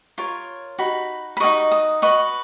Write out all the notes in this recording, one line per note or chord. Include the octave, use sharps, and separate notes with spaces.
F4 A#4 C#5
D#4 F#4 B5
B5
D#4 F#4 A#4 D#5 C#6
D#6
F#4 B4 D#5 C#6